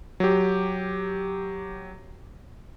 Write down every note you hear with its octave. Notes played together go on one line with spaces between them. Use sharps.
F#3 G4